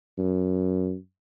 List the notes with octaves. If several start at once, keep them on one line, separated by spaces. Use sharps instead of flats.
F#2